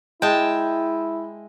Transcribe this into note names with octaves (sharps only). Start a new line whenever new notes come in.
G#3 E4 G5 A5